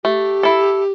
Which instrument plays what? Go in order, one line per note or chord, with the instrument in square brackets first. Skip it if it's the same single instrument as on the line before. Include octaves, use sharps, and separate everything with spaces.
[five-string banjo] A3 [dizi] G4
[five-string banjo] E4 A4